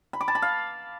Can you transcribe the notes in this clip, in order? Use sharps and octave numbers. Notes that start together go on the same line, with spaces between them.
B5
D6
A5
B5
F5